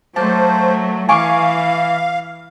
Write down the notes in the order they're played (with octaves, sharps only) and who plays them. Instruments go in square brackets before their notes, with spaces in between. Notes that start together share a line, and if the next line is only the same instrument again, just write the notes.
[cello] F#3 A3 [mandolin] A#3 A5 [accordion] C5
[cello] E3 [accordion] F5 [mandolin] G#5 C#6 D6